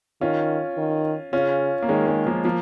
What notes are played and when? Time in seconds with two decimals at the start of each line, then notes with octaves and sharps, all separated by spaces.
0.21 D#3 C#4 F4
0.77 D#3
1.33 C#3 C#4 F4
1.82 A#3
1.89 D#3 G#3 C#4
2.07 G#3 C#4
2.27 F3 A#3
2.45 F3 A#3